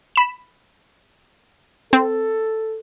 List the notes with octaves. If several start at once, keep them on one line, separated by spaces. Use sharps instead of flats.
B5 E7
C4 A4